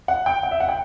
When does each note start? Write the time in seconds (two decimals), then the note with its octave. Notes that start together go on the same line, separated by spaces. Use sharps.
0.08 F#5
0.26 G5
0.43 F#5
0.51 E5
0.60 F#5
0.69 G5